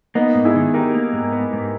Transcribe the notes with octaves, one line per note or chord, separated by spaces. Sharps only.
A#3 B3 D#4
G#2
E4 G#4
D#3
D#4 G4 A#4
A#3
G#2
B3
G#2